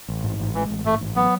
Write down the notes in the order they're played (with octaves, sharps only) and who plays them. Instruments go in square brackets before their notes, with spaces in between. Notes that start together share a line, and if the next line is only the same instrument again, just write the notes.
[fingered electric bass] A1
G#2
A1
[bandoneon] E3 [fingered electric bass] G#3
[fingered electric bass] A1
[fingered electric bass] G#2 [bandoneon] A3
[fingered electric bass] A1
[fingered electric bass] F#3 [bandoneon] B3